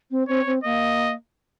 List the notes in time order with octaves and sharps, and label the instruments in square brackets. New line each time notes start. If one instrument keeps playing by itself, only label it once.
[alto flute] C4
[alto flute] C4 [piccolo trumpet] C#5
[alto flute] C4
[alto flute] A#3 [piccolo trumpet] D#5